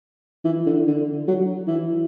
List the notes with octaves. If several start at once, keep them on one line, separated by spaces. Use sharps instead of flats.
E3
D3
D3
F#3
E3